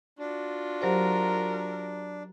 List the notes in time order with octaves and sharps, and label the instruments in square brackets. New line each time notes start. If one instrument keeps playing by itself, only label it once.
[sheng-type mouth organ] D4 [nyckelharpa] F4 F#4
[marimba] F#3 G4 C5 [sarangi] A#4